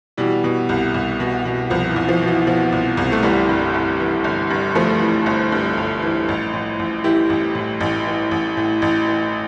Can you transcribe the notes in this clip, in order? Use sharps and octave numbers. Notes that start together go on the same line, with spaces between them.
B2 E3 G3
B2
C2
C2
B2
B2
C2 F3
E3
C2
F3
B2
E3
B2 F3
C2
C2
A3
G1 E3 G3
G2
G1
E3
G1
G2
G1 F3 A3
E3
G1
G2
G1
E3
A1
A2
A1
E3 E4 G4
A1
A2
A1
E3
A1
A2
A1
E3